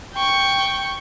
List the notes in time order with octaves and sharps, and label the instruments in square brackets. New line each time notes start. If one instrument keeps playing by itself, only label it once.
[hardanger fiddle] G5 C#6